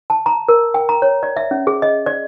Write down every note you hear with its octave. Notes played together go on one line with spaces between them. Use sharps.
A5
A#5
A#4
G5
A#5
C#5
D5
E5
C#4
G#4
D#5
D5